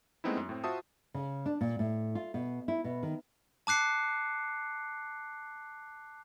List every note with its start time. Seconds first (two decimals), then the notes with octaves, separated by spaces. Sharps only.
0.24 G#3 A3 B3 C4 D#4 E4
0.37 F#2
0.49 A2 C4
0.64 F4 F#4 C5 E5 A5 D#6
1.14 C#3
1.46 D4
1.61 A#2
1.79 A2
2.15 F4
2.34 B2
2.68 E4
2.84 B2
3.03 D#3
3.67 A5 D6 F#6 C7 C#7